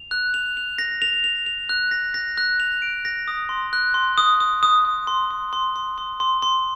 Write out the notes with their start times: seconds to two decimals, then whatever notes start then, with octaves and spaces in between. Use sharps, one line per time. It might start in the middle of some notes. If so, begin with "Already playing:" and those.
Already playing: F7
0.11 F#6
0.34 F7
0.57 F7
0.78 A#6
1.02 F7
1.24 F7
1.46 F7
1.69 F#6
1.91 A#6
2.14 A#6
2.38 F#6
2.60 F7
2.82 D7
3.05 A#6
3.28 D#6
3.49 C6
3.73 F#6
3.94 C6
4.18 D#6
4.40 D#6
4.63 D#6
4.85 D#6
5.07 C6
5.31 C6
5.53 C6
5.76 C6
5.98 C6
6.20 C6
6.42 C6